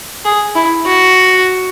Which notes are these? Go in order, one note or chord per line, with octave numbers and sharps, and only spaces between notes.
G#4
E4
F#4